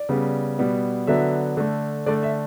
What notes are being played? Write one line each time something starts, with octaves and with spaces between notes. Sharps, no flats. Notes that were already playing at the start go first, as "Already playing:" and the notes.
Already playing: D5
C#3 G3 B3
B2 G3 B3
D3 F#3 B3 E5
D3 A3
D3 A3 D5
E5